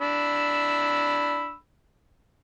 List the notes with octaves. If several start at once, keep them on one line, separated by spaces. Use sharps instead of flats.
D4 B5 E6